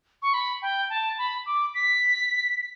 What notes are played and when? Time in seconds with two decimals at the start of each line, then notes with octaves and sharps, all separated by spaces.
0.22 C#6
0.34 B5
0.62 G5
0.90 A5
1.18 B5
1.46 D6
1.74 B6